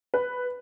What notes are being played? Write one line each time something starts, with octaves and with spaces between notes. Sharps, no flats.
B4